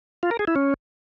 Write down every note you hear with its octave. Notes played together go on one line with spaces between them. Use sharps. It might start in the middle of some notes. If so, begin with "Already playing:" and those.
F4
A#4
G#4
E4
C#4